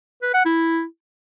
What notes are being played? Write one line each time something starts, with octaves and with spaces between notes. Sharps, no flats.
B4
F#5
E4